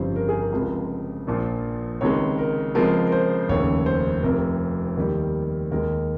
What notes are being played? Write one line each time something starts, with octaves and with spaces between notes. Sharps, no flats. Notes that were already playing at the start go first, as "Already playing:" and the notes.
Already playing: G1 F2 C#3 G3 C5
A#4
G#4
A#4
C#2 C3 F3 G#3
A#1 A#2 F3
C#2 C3 D#3 G#3 C#5
A#4
C#2 C3 F3 G#3 A#4
A#4
C5
F1 D#2 C#3 C#5
C5
F1 F2 C3 A#4
D#2 D#3 G3
D#2 D#3 G#3 A#4